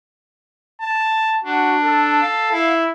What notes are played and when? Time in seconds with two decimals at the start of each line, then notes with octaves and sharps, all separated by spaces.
0.81 A5
1.44 D4 F#4
1.84 A4
2.21 F5
2.52 E4